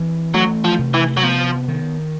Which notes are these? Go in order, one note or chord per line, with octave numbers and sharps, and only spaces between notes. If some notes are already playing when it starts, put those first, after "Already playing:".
Already playing: E3 C4
F#3 A3
F3
C3
E3
F#3
F3 B3
D#3